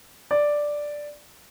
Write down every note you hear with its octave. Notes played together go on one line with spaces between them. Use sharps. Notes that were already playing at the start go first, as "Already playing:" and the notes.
D5